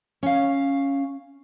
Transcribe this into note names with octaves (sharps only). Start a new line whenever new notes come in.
C#4 F5